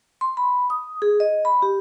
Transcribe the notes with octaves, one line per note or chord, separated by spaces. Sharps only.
C6
B5
D#6
G#4
D#5
B5
G4